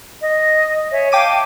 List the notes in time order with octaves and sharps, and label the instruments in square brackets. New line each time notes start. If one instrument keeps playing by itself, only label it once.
[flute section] D#5
C#5 E5 G#5
[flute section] F5 A5 [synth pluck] G5 D6 D#7